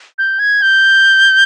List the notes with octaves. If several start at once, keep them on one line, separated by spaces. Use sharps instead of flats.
G6
G#6
G6